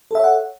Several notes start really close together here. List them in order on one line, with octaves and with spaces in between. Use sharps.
A4 E5 C#5 F#5